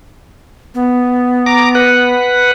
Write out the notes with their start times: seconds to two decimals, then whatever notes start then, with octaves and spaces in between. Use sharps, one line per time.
0.75 B3
1.46 A#5 D6
1.75 B4 F#5